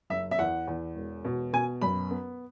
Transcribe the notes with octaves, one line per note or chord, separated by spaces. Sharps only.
F#1 E5
E5
E2 F#5
E2
E1
B2
B2 G#5
F#2 B5
B3